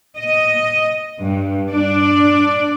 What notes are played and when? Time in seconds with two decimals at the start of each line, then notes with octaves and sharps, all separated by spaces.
0.16 D#5
1.22 G2
1.69 D4 D5